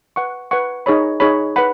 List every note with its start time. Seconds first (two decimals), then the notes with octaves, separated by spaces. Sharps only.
0.16 B4 F#5 C#6
0.51 B4 F#5 C#6
0.86 D#4 G#4 C#5 B5
1.20 D#4 G#4 C#5 B5
1.56 B4 F#5 B5